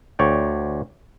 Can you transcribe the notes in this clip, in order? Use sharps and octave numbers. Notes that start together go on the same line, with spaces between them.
D2 C#5 D5 G5